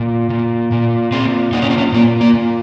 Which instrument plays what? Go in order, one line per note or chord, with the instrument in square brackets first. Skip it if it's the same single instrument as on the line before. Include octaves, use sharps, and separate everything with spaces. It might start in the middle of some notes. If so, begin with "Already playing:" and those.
Already playing: [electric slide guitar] A#2
A#2
A#2
A#2 C4
A#2 D#4
C#4
C4
C#4
A#2 A#3
A#3
A#2